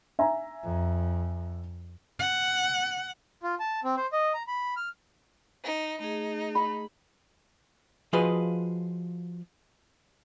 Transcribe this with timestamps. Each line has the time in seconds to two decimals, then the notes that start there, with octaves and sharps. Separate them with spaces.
0.19 E5 G#5 A#5
0.63 F2
2.20 F#5
3.43 F4
3.60 A5
3.84 C4
3.97 C5
4.13 D#5
4.34 A#5
4.48 B5
4.77 F6
5.64 D#4
6.00 A3 D#4 G#4
6.55 B5
8.13 F3 F4 F#4 G#4 B4 D#5